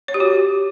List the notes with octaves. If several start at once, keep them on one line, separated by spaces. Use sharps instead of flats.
C#5
G4
F#4